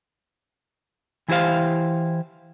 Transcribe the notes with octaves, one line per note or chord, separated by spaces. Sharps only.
E3 E4 G4 C5 F5